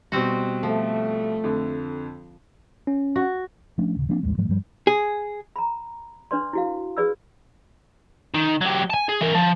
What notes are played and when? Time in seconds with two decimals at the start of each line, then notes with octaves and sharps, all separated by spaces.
0.12 B2 G3 C4 F#4
0.63 F3 A3
1.44 F2 D3
2.87 C#4
3.16 F#4
3.78 F3 A3 C#4 D4
3.96 D#1 C#3
4.09 F3 A#3 C4 D4
4.23 A1 D#2 G3 G#3
4.37 G#2 F3 F#3 A3
4.49 G2 F3 G3
4.87 G#4
5.56 A#5 B5
6.31 D4 B4 D5 C6
6.53 E4 F#4 F5
6.97 G#4 B4 D5 B5 E6
8.34 D#3
8.61 F#3 G4
8.90 G#5 A5
9.09 G#4
9.21 E3 A#4
9.34 F3